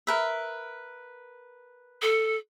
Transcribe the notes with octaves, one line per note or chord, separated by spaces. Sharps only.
A#4 B4 E5
A4